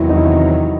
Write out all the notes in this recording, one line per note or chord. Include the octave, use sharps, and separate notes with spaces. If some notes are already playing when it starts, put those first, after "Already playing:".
Already playing: E2 C3 D#3 F#3 E4
D#4
E4